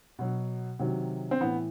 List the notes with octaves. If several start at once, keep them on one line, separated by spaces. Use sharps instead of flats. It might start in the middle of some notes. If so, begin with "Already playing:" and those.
B2 F#3
C3 D#3 F#3
C4
A2 E3 B3